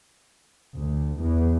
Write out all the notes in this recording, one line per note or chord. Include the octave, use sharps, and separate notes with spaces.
D2
E2